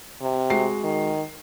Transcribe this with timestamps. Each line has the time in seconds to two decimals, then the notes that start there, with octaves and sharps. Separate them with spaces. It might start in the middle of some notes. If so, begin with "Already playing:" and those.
0.22 C3
0.50 G#3 F#4 C7
0.84 D#3